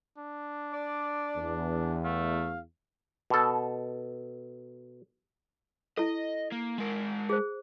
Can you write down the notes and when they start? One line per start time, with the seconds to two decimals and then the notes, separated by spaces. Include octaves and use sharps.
0.18 D4
0.73 D5
1.36 E2
2.05 A3 F5
3.30 B2 A4
5.97 E4 A4 D#5
6.52 A#3
6.78 G#3 A#4
7.29 G#4 C5